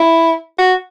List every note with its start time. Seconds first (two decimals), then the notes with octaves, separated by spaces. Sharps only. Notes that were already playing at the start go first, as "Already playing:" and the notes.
Already playing: E4
0.59 F#4